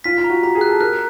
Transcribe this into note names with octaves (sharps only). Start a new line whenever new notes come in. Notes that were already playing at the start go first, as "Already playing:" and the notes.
F4 B6
F4
A#5
F#4
G4 A#5
G#4
F#6
A4
A#4 F#6